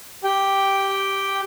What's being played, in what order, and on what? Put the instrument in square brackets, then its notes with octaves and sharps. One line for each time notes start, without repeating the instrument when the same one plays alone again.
[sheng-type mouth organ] G4 G5